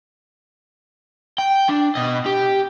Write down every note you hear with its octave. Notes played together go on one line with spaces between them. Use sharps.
G5
D4
B2 D#5
G4